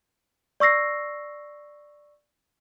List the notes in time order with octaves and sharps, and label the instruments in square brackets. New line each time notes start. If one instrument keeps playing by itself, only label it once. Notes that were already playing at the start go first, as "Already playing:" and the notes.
[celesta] D5 C#6 E6 A#6 C7